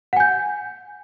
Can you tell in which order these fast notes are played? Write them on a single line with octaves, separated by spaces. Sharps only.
F#5 G#5 G6